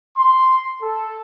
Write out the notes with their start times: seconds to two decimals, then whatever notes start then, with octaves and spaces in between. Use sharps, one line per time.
0.17 C6
0.82 A4